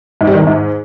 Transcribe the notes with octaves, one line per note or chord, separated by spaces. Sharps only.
G#2
G3
D#3
E2
G#2